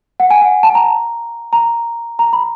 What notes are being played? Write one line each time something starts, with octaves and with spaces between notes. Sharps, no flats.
F#5
G#5
F#5
A5
A#5
A#5
A#5
B5